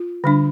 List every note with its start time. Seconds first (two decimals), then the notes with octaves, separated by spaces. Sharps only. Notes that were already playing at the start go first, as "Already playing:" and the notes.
Already playing: F4
0.24 D3 G3 D4